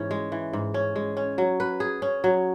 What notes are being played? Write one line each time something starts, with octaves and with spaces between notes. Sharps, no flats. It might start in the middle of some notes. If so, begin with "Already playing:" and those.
Already playing: G#2 E3 C#4
G#3
E3
G#2
C#4
G#3
C#4
F#3
B4
G#4
C#4
F#3